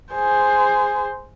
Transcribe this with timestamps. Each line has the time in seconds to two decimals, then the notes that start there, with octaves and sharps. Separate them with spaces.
0.13 G#4 C5